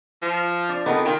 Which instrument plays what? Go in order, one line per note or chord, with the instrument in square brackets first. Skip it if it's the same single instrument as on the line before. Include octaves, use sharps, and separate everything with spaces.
[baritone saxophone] F3
[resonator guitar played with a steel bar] D4
[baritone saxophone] F2 [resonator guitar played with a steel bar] B3 D#4 A#4
[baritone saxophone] D#3 [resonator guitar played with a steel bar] F4 G5